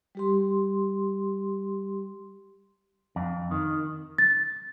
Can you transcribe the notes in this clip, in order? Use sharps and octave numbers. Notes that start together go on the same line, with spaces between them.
G3 G4 C6
F2
D#3
A6